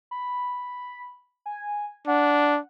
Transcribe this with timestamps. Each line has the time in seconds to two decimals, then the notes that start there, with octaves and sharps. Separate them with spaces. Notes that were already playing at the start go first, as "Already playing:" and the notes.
0.11 B5
1.46 G#5
2.07 D4 F#5